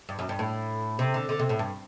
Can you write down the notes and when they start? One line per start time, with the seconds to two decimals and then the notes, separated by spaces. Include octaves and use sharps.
0.09 G2
0.19 F#2
0.29 G2
0.39 A2
0.99 C3
1.14 D3
1.29 D3
1.39 C3
1.49 A2
1.59 G2